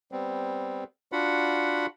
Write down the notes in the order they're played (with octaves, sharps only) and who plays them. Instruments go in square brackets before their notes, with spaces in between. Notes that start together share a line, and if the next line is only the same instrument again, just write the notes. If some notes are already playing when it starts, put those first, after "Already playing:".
[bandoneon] G3 B3 C4
D4 F4 F#4 F#5 B5